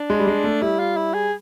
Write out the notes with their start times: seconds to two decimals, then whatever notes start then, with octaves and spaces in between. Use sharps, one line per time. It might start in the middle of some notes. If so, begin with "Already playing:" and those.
Already playing: D4
0.10 G#3
0.20 G3
0.27 G#3
0.44 A3
0.62 G3 E4
0.79 F4
0.97 E4
1.14 G#4